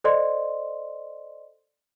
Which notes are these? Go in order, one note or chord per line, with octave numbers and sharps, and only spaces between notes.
A4 C5 D5 D#5 C6